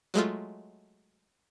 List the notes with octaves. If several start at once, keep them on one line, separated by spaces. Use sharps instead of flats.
F#3 G#3 A3 F4